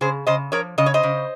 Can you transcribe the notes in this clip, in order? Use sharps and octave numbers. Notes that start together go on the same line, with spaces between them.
C#3 G#4 C5
C#3 C5 D#5
F3 A#4 C#5
C#3 D#5
C#5
C5 D#5
C#3